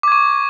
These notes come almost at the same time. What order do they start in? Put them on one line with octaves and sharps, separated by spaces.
D6 G#6 C#6